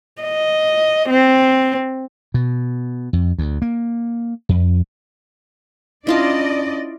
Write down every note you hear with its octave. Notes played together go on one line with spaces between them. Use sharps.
D#5
C4
B2
F2
D2
A#3
F2
C#4 D4 E4 F4 D5 D#5 A5